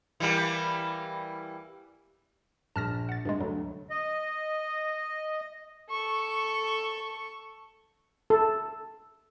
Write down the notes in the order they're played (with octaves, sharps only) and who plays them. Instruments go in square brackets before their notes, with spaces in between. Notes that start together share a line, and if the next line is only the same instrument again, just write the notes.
[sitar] E3 G3 A#3
[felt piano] A#1 [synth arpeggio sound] A5 F6 A#6
[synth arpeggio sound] F#5 A6
G2 C3 G#3
[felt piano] D2 [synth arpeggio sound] F#3
[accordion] D#5
[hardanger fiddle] A4 C#6
[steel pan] A4